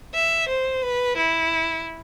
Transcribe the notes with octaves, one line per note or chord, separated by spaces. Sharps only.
E5
C5
B4
E4